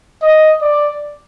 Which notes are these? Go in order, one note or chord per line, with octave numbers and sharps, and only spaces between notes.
D#5
D5